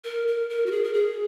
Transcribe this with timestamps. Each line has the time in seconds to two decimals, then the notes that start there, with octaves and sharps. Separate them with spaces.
0.04 A#4
0.27 A#4
0.50 A#4
0.66 F#4
0.71 G#4
0.84 A#4
0.94 G#4